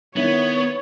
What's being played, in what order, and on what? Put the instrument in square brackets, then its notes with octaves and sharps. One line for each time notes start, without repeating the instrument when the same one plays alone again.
[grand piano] D#3 E4 [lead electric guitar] B3 [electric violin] C#5